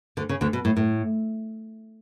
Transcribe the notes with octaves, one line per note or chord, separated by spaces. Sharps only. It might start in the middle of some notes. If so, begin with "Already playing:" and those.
D2 D3
C#3
D2 D3
B2
A2
A2